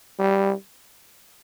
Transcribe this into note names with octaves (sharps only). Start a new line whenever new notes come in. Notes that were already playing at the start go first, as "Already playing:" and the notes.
G3